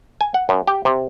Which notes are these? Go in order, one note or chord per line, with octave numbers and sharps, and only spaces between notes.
G#5
F#5
F#2
G4
C3